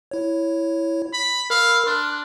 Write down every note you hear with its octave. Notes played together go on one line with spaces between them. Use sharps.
E4 C#5
B5
A#4 F5 B5 E6
D4 C6 F6 F#6